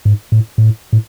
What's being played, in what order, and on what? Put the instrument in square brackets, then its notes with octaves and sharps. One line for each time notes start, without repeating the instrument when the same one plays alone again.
[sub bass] G#2
A2
A2
A2